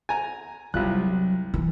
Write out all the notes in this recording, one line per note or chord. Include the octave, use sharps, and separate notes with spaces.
G#5 A#5
C2 F#3 F4 F#6
E3